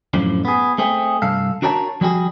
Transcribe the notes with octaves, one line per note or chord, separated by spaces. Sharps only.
F#2 A2 F3 D4
B3 G#4
A3 C4 G#4
C2 G2 A4 F5
D4 F#4 A#4 C#5 F#5 A5
F3 G3 F#4 G#4